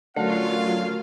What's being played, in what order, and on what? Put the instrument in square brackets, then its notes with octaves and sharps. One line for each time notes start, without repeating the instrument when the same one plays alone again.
[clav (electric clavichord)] D3 [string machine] F#3 F4 [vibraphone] A3 F#4 A#4 [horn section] C#4 F5